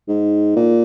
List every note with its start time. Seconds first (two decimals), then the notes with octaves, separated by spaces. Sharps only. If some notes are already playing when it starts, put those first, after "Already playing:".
0.08 G#2
0.56 A#2